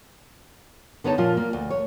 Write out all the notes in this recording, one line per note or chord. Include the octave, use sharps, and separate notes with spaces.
D3 B3 D#4 C#5 A5
A#2 F3 F4
A#3
D2
C#5